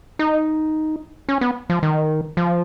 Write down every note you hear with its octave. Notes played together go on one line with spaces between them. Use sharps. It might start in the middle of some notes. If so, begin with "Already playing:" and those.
D#4
C#4
B3
F3
D#3
F3